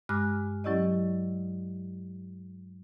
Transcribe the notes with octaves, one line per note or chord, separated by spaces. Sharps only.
G2 G#3 D6 F6 F#6
F#3 C#4 E4 G4 D5 D#5